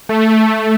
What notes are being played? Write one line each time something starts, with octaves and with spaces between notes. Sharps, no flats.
A3